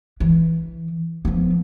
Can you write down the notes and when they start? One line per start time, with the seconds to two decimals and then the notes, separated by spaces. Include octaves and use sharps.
0.20 E3
1.25 F3 B3